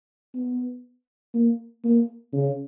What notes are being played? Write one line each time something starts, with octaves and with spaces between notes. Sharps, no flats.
B3
A#3
A#3
C#3